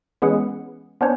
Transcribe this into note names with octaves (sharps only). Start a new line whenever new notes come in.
E3 G#3 B3 C#4 G#4 F#5
B3 C#4 D4 C5 C#5